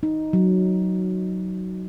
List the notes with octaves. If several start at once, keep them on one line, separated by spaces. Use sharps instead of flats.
D#4
F#3